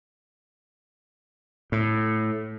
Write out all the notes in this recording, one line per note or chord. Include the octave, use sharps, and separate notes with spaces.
A2